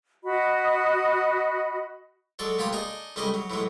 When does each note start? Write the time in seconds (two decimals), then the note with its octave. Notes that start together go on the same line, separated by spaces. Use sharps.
0.24 F#4 D#5 B5
2.39 F#3 G#3 A4 D5 C#6
2.58 D2 A#2 F4 G4 B5 C6
2.73 D4 D#4 G#4 D#5
3.16 C#2 G3 A3 G#4 D#5
3.34 F#3
3.50 A2 E3 F#3 G#3